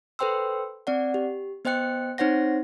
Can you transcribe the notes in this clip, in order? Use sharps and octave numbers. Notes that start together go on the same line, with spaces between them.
A4 B4 C5 G5 C6 E6
C4 D5 F#5
G4
B3 C5 D#5 G5 F#6 C#7
C4 D#4 C5 C#5 F#5 A#6